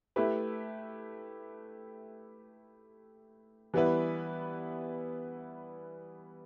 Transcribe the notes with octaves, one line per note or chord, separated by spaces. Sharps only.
A3 E4 G4 B4
E3 G3 B3 E4 B4